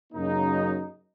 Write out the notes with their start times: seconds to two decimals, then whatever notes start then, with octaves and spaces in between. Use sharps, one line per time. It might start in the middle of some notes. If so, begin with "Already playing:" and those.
0.13 F#2 C#3 F#3 A#3 D#4